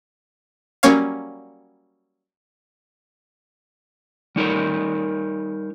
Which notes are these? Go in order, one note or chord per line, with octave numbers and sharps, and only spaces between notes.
F#3 G3 A#3 C#4 C#5 F5
G3 D#4 A#4 C#5